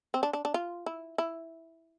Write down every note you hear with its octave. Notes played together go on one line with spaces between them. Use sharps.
C4
D4
D4
D4
F4
E4
E4